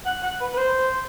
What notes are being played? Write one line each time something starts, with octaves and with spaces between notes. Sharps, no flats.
F#5
F#5
B4
B4
C5